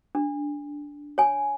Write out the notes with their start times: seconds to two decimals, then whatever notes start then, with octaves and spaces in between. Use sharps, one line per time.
0.15 D4
1.18 C#5 G#5